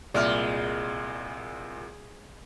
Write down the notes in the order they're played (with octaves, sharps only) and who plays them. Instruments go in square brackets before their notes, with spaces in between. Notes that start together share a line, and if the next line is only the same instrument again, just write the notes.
[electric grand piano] C2 A#2 F6 [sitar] G#3 [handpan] D5 E5